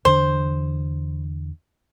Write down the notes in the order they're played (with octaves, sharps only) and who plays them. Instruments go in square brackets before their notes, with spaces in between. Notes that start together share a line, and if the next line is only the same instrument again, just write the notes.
[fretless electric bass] E2 D3 D4 [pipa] C5